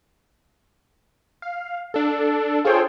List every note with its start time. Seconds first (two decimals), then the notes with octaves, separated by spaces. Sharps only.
1.42 F5
1.94 D4 A4
2.65 F4 G#4 A4 C5 C#5 G5